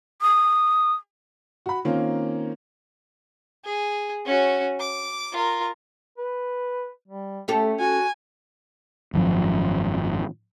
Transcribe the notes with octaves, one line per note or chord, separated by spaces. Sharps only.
D#6
F#4 B5
D#3 A#3 C4 C#4 F4
G#4
C#4 F#4
D6
F4 A#4
B4
G3
A3 C#4 G4 A4
F#4 G#5
G#1 F#2 D3 F3